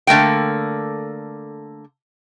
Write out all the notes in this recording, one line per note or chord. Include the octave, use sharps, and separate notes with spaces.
D3 A3 A#3 G5